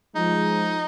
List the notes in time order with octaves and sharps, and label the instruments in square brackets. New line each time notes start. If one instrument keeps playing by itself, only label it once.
[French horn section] F3 G#3 [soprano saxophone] D#4